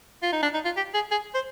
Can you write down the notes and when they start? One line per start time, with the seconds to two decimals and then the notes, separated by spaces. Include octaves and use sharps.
0.22 F4
0.32 D#4
0.43 D4
0.54 D#4
0.65 F4
0.77 G4
0.94 G#4
1.11 G#4
1.34 C5